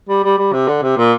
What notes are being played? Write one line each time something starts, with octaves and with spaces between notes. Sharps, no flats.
G3
G3
G3
C3
D3
C3
A#2